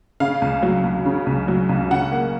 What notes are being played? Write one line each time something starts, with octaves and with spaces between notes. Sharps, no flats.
C#3 F5
C#2
F#3
C#2
C#3
C#2
F#3
C#2
C#3 F#5
A#3